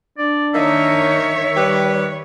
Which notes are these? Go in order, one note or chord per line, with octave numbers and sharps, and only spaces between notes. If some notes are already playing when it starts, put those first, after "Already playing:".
D4 D5
D#3 A#3 D#4 C#5 E5
G3 G4 B4